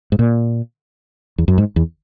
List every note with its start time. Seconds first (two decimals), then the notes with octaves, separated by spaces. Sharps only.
0.12 G#2
0.19 A#2
1.38 E2
1.48 F#2
1.58 G#2
1.76 E2